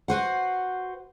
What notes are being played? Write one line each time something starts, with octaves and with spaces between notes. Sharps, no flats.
F#4 B4 C5 F#5